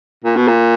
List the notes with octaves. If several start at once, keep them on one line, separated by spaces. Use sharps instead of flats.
A#2
B2
A#2